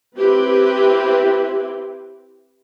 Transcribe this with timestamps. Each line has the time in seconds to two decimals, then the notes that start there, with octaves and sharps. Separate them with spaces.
0.17 C4 E4 G4 B4